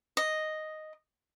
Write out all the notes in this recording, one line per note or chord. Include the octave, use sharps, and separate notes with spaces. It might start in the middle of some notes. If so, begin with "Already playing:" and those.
D#5